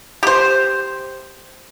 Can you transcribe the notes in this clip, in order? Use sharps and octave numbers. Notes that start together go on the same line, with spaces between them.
G4 C5